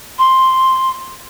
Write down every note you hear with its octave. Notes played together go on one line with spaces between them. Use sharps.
C6